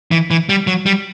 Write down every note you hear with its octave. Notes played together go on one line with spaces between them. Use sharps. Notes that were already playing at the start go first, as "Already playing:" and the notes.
E3
E3
G3
F#3
G3